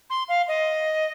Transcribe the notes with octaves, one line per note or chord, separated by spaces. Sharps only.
C6
F5
D#5